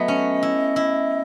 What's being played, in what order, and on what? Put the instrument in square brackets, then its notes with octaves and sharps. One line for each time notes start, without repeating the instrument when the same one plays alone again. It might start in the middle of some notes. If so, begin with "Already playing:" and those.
Already playing: [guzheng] F#3 A3 B3 [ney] D#5
[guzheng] C#4
E4
E4